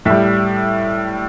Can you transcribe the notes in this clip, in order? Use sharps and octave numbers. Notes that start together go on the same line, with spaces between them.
A2 G3 E5